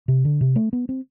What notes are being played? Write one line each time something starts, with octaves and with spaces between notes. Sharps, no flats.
C3
D3
C3
A3
B3
C4